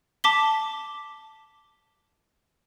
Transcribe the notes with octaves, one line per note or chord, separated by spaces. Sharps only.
A5 D6 B6 G7